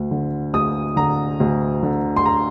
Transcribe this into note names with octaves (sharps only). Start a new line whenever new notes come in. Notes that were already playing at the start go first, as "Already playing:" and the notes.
Already playing: D2
D3
D2 D#6
D3 A#5
D2
D3
C6
A#5